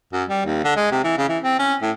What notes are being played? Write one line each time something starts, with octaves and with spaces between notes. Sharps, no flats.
F#2
G3
D#2
D3
G#3
C3
E3
C#3
E3
C4
C#4
A2